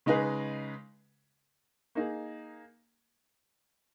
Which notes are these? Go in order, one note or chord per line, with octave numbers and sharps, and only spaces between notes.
C#3 G#3 D#4 G#4 B4
A#3 D#4 G#4